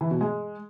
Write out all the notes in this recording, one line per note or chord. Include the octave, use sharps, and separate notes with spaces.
E3
B2
G#3